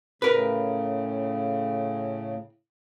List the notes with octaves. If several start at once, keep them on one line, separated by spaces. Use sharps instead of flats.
A2 C#3 A#4 B4